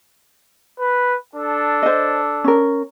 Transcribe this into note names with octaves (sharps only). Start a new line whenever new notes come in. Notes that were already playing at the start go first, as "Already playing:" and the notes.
B4
D4 A4
C5 D#5
C#4 A#4